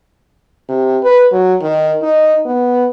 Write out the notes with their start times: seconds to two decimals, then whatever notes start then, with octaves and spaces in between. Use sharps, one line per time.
0.69 C3
1.03 B4
1.32 F#3
1.62 D#3
2.03 D#4
2.46 B3